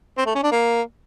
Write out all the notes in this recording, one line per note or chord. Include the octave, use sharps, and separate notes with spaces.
C4
A3
C#4
D4
A#3